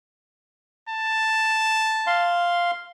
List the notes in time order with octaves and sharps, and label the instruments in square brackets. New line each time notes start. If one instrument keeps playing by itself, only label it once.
[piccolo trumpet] A5
[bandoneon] F5 C6